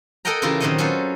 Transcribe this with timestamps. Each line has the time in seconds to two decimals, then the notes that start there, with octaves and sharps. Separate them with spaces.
0.25 A4 A#4 D#5 F#5 G5 A#5
0.42 C#3 E3 E4 F4 G4 A#4
0.60 A#2 D#3 F#3 C4 C#5 D#5
0.78 F#3 C#4 F4 A4 B4 C5